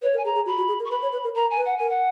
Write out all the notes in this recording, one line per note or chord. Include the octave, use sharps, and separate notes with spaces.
B4 C#5
A#4
G#5
G#4 A#5
G#4
F#4 B5
F#4
G#4
A#4
C#6
B4 B5
C#5
B4
A#4
A#4 A#5
G#5
B4
F#5
A#4 G#5
F#5